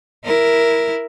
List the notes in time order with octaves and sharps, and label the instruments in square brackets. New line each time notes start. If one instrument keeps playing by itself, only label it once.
[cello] E4 A#4